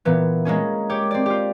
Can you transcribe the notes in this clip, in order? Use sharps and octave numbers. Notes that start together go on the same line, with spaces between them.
A#2 E3 B3
G#3 A#3 C#4 G#4
G4 C#5 D6
C4 D5
F4 G4